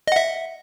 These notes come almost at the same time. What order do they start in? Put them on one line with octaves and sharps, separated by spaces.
D#5 F#5 E5